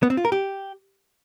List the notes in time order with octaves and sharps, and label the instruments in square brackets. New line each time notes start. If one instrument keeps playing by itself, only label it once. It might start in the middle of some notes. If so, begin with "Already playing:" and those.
[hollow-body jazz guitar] B3
C4
F4
A#4
G4